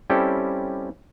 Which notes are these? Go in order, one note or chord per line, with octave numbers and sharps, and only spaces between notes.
G3 C4 C#4 E4 G4 A4